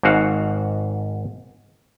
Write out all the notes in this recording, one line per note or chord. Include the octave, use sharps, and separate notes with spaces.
G#1 G#2 F#4 F5 F#5